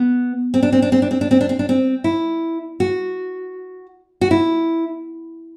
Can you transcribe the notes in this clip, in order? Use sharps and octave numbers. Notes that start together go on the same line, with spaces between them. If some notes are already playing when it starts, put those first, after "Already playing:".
Already playing: B3
C4
D4
C4
D4
C4
D4
C4
D4
C4
D4
C4
D4
C4
E4
F#4
F#4
E4